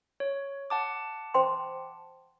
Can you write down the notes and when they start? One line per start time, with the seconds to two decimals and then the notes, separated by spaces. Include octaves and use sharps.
0.20 C#5
0.70 F#5 A5 D6
1.34 C5 G5 C6